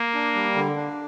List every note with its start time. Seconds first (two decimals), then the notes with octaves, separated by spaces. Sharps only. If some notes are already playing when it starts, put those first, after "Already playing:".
Already playing: A#3
0.14 D4
0.35 G3
0.55 D3
0.76 D4